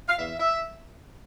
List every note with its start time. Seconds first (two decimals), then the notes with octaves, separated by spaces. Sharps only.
0.07 F5
0.19 E2 E5
0.38 E5